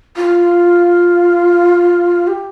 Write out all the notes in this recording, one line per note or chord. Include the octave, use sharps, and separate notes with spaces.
F4
G4